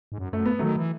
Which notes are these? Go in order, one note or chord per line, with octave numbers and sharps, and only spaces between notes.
G#2
F#2
F#2 A3
B3
D#3 F#3 A3
E3